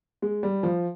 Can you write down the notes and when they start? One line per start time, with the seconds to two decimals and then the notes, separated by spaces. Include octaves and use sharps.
0.22 G#3
0.43 G3
0.63 F3